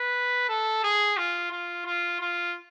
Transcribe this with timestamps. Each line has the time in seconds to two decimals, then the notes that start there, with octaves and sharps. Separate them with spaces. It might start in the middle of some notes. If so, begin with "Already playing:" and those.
Already playing: B4
0.49 A4
0.83 G#4
1.17 F4
1.51 F4
1.85 F4
2.20 F4